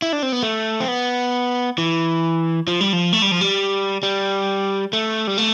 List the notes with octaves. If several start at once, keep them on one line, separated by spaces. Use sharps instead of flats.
E4
D4
C4
B3
A3
C4
B3
E3
F3
G3
F3
A3
G3
F3
G3
G3
A3
G3
A3